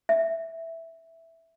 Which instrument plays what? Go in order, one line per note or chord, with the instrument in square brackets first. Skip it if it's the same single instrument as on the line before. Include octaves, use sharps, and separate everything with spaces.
[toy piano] E5